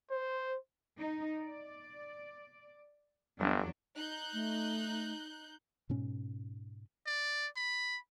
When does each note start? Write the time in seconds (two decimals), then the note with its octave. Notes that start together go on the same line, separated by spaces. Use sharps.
0.10 C5
0.97 D#4
1.38 D5
3.39 G1 E2 F#3 D4
3.97 D#4 F#6 G6
4.34 A3
5.90 G#2 B2 C#4
7.06 D5
7.56 B5